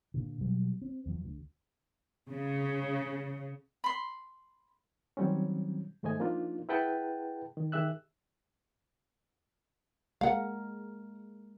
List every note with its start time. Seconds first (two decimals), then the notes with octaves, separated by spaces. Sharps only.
0.14 A#2 D3
0.41 B2 F#3 G3
0.82 C4
1.06 E2 F3
1.25 D2
2.29 C#3
3.84 B5 C6
5.17 D#3 F#3 G3 C4 C#4
6.03 D#2 G#2 A3 C5 D#5 G#5
6.20 F3 A#3 D4 D#4 F4
6.69 E4 G#4 B4 F#5 G5 A5
7.57 D#3
7.72 D#3 G4 G#4 E5 E6 F#6
10.21 G#3 A#3 A#4 F5 F#5